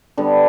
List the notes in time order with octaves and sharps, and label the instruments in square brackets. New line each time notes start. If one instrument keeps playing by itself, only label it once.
[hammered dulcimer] D3 G3 B3